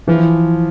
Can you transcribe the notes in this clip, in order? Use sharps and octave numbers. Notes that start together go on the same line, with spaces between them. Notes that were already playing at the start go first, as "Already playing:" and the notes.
E3 F3